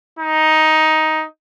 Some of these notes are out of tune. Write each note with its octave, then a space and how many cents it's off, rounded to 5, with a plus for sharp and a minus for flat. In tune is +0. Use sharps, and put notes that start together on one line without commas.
D#4 +10